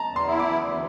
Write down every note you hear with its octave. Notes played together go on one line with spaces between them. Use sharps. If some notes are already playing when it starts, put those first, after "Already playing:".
Already playing: A5 A#5
E2
C6
E4
D6
E2
D2